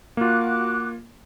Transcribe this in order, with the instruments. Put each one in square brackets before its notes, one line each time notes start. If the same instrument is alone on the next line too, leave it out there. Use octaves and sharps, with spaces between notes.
[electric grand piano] A#3 F4 [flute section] F#4 D6 F#6